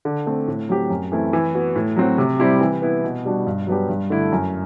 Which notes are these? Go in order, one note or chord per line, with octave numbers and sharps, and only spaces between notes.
D3
A3 C4
A2
F#3 C4 G4
F#2
E3 A3 C4 E4
E3
B3 F#4
A2
F#3 C4 F#4
C3
G3 C4 E4 G4
E3
B3 E4
B2
G3 D4 F#4
G2
F#3 B3 D4 G4
G2
D3 A3 E4
F#2